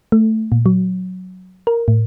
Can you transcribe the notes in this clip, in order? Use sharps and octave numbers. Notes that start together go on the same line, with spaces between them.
A3
A#2
F#3
A#4
A2